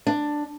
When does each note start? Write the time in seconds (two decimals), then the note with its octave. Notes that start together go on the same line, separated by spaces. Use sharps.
0.07 D4